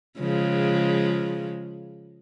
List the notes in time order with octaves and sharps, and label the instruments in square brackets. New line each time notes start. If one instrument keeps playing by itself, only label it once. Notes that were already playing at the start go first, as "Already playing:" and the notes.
[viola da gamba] C#3 F3 G#3